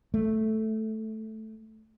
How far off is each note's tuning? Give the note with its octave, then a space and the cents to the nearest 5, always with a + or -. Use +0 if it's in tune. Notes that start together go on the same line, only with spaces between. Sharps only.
A3 -5